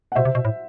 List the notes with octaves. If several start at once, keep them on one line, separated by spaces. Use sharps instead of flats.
F#5
B2 C5 E5
C3
B2
A2